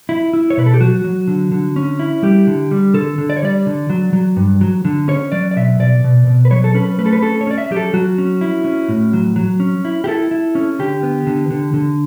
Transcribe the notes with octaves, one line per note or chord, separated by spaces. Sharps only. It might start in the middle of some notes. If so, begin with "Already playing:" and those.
E4
E4
C#5
B2 B4
A4
G4
F#3 F#4
F#3
D3
D3
C#4
E4
G3 G4
D3
G3
D3 A4
D3
D5
C#5
G3 D5
D3
F#3
F#3
G2
F#3
D3
C#4 C#5
F#3 D5
D5
B2 E5
B2 D5
B2
B2
B4
F#3 C#5
A4
C#4 B4
A3 B4
A4
B4
C#4 A4
C#5
C#4 D5
E5
F#3 G4
A4
F#3 F#4
C#4
E4
C#4
A2
F#3
F#3
C#4
E4
G4
E4 A4
E4
C#4
D3 G4
B3
D3
D3
D3